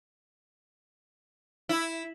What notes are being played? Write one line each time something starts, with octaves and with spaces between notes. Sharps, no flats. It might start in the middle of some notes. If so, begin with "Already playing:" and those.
E4